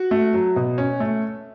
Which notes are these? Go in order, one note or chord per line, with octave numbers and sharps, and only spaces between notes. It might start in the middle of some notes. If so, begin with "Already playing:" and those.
Already playing: F#4
A3
F#3
B2
C#4
A3